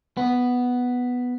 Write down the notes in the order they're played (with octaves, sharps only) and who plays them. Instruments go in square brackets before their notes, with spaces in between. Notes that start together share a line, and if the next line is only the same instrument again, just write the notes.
[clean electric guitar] B3